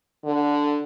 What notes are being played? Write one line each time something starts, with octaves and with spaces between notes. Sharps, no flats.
D3